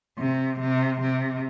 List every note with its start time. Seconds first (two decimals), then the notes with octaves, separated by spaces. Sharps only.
0.19 C3
0.61 C3
1.01 C3